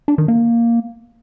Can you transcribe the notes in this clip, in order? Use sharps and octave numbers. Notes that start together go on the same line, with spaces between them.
D4
D#3
A#3